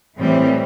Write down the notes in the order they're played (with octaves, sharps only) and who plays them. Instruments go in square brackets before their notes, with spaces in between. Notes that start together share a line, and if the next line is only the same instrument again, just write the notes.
[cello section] A2 E3 G3 C4